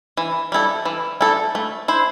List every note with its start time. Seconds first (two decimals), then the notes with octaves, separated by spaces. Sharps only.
0.17 E3
0.52 G3 E4 A4
0.85 E3
1.21 G3 E4 A4
1.55 A3
1.88 E4 C5